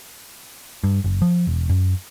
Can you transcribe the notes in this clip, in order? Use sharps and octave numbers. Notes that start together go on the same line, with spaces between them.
G2
F#1
F3
E1
F#2